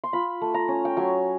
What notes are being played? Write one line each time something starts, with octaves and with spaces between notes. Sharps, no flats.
C6
F4 B5
A3
A#5
C#4
G5
F#3 G#5